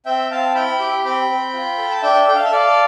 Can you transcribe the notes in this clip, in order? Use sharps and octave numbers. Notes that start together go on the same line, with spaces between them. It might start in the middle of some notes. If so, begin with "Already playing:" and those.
C4 E5 G5
C4 F5 A5
E4 G5 B5
G4
C4 G5 B5
C4
F4
A4
A5
D4 E5 G5
A4 G5
F5
E5
A4 D5 F5